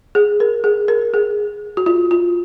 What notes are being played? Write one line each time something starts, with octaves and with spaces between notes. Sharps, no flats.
G#4
A#4
G#4
A#4
G#4
F#4
F4
F4